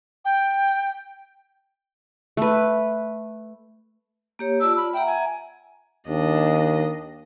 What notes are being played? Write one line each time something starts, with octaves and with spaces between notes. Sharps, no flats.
G5
A3 B4
A#3 G4 C#5
F4 D5 A5 E6
B5
E5 F#5 G5 A#5
G#5
D#2 D4 D#5